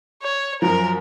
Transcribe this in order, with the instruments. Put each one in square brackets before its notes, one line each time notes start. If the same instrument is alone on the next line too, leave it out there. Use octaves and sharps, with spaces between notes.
[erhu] C#5
[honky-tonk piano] F#2 F3 [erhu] A#4